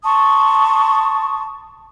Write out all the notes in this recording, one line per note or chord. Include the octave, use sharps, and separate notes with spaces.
A5 C6 C#6 D#6